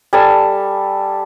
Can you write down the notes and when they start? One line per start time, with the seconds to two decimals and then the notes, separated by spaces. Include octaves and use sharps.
0.13 G3 A4 G#5 A5